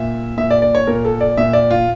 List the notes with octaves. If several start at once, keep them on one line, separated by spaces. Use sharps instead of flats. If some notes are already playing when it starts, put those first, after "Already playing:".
Already playing: A#2 E5
A#2 E5
D5
D5
C#5
A#2 A#4
A4
D5
A#2 E5
D5
F4